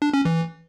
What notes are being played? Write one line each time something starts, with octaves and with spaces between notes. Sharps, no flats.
D4
C#4
E3